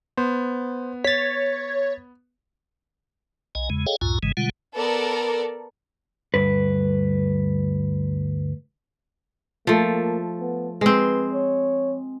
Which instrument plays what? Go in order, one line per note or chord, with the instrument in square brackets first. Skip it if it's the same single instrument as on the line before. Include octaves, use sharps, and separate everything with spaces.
[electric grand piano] B3 [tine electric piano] C5
[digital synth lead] C#5 [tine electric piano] A6 B6
[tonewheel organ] B1 D#5 G#5
E2 C#3 G#3
G#4 A4 C#5 D#5 F5 G5
C#2 F#2 A2 F4 G#5 A#5
G#1 G#2 C#3 E3 G#3
B2 D3 G3 G#3 F4 F#5
[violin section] B3 A4 A#4 D5
[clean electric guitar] D2 G2 B4
[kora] F3 A3 [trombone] A#3
[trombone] B3
[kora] G#3 C4 [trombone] B4
[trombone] C#5